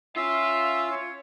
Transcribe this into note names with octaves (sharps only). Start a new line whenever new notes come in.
C#4 F4 E5 C6 E6
C#5